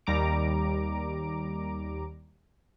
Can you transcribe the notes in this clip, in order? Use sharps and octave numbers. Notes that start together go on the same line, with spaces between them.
D#2 G3 A#5 D6 D7